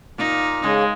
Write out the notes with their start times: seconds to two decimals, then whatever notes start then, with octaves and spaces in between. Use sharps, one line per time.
0.18 A#2 D#4
0.64 C#3 G#3